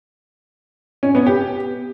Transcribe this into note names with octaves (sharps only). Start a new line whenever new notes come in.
C#4
B3
G4